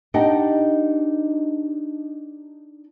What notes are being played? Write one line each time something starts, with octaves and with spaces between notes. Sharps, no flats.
D4 D#4 G4 D#5 F#5 G5